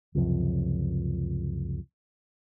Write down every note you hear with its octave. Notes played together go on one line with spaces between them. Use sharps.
C#2 F#2 C3 F3